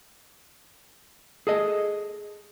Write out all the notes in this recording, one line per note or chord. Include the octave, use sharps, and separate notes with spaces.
G#4 A4 D#5